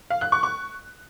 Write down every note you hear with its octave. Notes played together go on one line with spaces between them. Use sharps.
F5
F#6
C#6
C#6